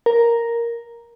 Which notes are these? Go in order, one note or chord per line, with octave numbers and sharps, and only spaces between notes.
A#4